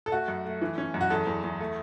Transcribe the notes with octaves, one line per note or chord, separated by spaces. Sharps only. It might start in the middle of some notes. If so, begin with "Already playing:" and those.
A4
A3 F#4
F#2
A3
E3
C#4
F#2
F#4
E2 A4
E2
E2
A3